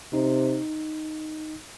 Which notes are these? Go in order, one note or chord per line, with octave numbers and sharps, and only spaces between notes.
C3 D#4